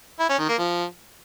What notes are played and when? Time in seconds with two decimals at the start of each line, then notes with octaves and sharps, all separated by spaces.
0.20 E4
0.29 C#4
0.39 D#3
0.49 A#3
0.58 F3